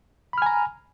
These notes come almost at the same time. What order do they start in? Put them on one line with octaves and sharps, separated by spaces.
B5 F6 G#5 A#5